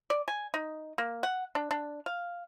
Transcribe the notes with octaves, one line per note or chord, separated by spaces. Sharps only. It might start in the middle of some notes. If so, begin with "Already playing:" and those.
D5
G#5
D#4
A#3
F#5
D4
D4
F5